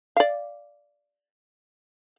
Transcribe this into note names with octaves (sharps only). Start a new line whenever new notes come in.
D5 F5